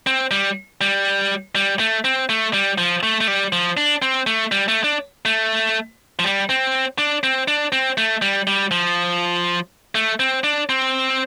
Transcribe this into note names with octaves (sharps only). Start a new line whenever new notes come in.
C4
G3
G3
G3
A3
C4
A3
G3
F3
A3
A3
G3
F3
D4
C4
A3
G3
A3
D4
A3
F3
G3
C4
D4
C4
D4
C4
A3
G3
G3
F3
A3
C4
D4
C4